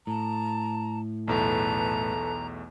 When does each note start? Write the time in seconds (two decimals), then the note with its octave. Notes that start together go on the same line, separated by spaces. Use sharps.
0.07 A2 A5 A#5
1.28 B1 E2 A3 A4 B4 A5 A#5